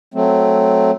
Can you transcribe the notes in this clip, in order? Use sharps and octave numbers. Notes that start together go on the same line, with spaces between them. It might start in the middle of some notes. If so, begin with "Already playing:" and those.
F#3 A3 C4